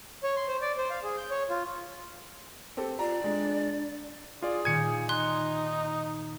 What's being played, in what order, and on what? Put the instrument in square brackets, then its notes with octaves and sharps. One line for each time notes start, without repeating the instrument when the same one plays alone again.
[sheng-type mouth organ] C#5
C6
C5
D5
C5
F5
G#4
G6
C#5
F4
[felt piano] C4 G4 A4
[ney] F4 [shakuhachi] D5 [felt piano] A#5
[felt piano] G#3 [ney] D4
[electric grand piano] F4 D5 [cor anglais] G#4
[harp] A#2 D#3 A#3 [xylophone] G#5 [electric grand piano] G#6 C#7
[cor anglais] D#4 [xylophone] C6 F#6